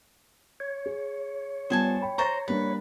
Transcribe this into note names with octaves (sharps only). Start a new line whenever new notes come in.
C#5
G#4
G3 B3 F4 C5 G#5 A5
G5 B5
C5 A#5 C#6 A6 A#6
G3 A#3 D4 B4